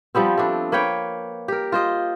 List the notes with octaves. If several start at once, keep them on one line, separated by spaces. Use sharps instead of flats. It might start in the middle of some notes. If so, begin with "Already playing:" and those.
F3 G3 B3 C4
A3 D4
A#3 B4 C#5 G5
G4 A#4
F4 C5 D#5